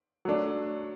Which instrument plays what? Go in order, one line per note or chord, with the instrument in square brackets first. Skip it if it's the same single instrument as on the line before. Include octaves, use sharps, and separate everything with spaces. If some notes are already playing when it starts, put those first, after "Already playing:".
[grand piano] F#3 A3 D4